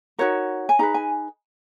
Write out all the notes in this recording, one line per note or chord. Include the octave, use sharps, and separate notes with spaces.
D#4 F#4 A#4 C#5
G#5
D#4 G#4 B4 A#5
G#5